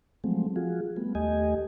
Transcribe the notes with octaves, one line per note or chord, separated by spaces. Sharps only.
F3 F#3 G#3 A3 C4
F3 F4 F#4 G#4
G3 A3 B3
D#2 A3 G4 D#5 G#5